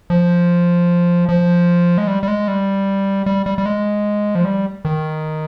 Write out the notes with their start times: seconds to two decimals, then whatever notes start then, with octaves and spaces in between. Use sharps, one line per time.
0.10 F3
1.29 F3
1.98 G#3
2.07 G3
2.23 G3
2.28 G#3
2.48 G3
3.26 G3
3.46 G3
3.58 G3
3.66 G#3
4.35 F3
4.45 G3
4.85 D#3